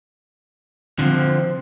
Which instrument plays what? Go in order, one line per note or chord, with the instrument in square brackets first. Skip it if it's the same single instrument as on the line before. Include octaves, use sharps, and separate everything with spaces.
[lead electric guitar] D3 F3 [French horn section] C4